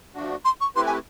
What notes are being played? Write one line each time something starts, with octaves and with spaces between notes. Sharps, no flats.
F3 A3 D4 F#4
C6
C#6
A3 C4 E4 G4 B4 C6
G#5